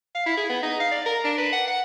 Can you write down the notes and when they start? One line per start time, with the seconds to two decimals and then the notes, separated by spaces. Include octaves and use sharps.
0.15 F5
0.26 E4
0.37 G#4
0.49 B3
0.63 D#4
0.80 F5
0.91 D5
1.06 A#4
1.24 D4
1.38 B4
1.53 F#5
1.67 F#5